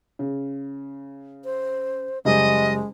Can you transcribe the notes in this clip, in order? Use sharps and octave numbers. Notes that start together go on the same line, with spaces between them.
C#3
C5
F#1 G3 G#3 D#5 G#5